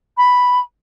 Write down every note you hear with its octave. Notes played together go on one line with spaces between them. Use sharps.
B5